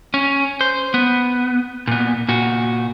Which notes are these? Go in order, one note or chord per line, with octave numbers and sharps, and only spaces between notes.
C#4
C5
B3
A#2 B3
A#2 F#4